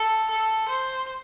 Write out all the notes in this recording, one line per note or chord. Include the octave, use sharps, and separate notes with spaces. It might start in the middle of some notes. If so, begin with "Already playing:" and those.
Already playing: A4
A4
C5